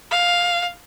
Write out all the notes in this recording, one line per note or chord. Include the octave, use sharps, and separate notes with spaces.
F5